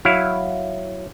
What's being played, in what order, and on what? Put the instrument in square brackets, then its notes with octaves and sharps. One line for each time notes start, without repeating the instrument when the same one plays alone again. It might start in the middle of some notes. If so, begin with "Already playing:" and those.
[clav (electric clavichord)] F#3 E4 F5